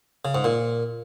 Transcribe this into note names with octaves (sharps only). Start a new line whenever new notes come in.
C#3
G#2
A#2